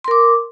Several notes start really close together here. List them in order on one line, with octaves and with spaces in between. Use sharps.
C6 A#4 D6